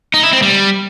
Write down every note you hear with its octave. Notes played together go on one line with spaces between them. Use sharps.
D#4
E4
C4
G3